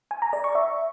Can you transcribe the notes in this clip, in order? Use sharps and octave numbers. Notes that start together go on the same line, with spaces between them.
G#5
A#5
D5
C#6
E5